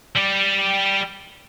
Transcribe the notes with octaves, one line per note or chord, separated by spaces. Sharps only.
G3 G4